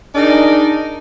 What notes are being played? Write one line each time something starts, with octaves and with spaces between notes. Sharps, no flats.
D4 D#4 G#4 A#4 D5 D#5